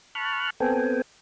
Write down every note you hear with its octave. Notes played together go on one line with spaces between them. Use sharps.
A5 B5 C#6 F6 F#6
B3 C4 A4 G5 G#5